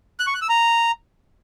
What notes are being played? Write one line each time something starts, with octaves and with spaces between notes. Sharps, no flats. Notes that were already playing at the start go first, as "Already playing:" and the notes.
F#6
C#6
F#6
E6
A#5